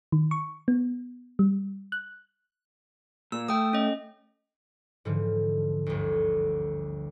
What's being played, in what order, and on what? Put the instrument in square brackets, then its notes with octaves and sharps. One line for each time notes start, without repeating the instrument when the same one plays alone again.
[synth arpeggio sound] D#3
C#6
B3
G3
F#6
[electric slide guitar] A#2 [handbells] E6
[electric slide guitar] A3 [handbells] G5 D#6
[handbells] C#4 D#5
[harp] G#2 D3 E3 F3
G1 D2